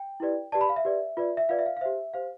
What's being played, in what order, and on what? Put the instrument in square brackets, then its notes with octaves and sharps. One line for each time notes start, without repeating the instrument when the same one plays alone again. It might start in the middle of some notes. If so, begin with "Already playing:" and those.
Already playing: [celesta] G5
E4 G4 B4 D5
G4 B4 D5 A5
B5
F5
E5
G4 B4 D5
F4 B4 D5
E5
F4 B4 D5 F5
E5
F5
F5
G4 C5 E5
G4 C5 F5